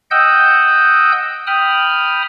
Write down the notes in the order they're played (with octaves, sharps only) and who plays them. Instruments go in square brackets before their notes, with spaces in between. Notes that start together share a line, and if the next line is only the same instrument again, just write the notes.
[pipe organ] D#5 F#5 G5 E6 G6
G5 B5 D#6 F6